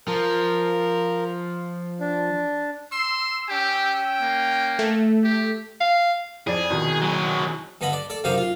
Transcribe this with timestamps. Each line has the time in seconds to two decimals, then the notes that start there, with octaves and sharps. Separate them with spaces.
0.08 F3 A#4
2.01 D4
2.92 C6 E6
3.49 C#4 G4 G5
4.22 A#3
4.79 A3
5.24 G4
5.80 F5
6.47 F2 G#4 D5
6.70 C2 B2 D#3
7.01 F#3 G#4
7.81 G2 D3 B3 D#5 B5
7.93 D5
8.10 A4 D5
8.24 F#2 C3 D#4 C5 F5 D6
8.38 F4